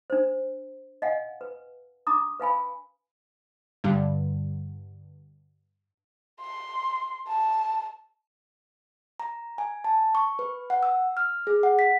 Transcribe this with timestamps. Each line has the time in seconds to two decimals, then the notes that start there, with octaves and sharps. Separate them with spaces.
0.10 D4 C5
1.02 D#5 F5 F#5 G#5
1.41 B4
2.07 D4 A#5 D6 D#6
2.40 B4 F5 G#5 B5
3.84 G2 D3 G3
6.41 C6
7.27 A5
9.20 A#5
9.58 G#5
9.84 A5
10.15 C#6
10.39 B4
10.70 F#5
10.83 E6
11.17 F6
11.47 G#4
11.63 F#5
11.79 B6